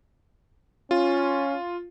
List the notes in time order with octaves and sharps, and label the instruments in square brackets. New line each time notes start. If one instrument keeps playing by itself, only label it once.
[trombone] C#4 [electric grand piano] F4